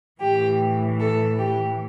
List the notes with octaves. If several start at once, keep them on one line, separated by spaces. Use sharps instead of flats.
A2 E3 G4
A4
G4